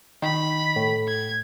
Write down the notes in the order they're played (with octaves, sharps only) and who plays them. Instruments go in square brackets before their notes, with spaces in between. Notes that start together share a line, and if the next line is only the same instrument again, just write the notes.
[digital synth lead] D#3 [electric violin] B5
[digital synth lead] A2
[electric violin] G#6